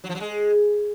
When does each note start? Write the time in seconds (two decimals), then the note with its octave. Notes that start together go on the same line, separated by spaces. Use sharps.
0.04 F#3
0.09 F3
0.15 F#3
0.20 G#3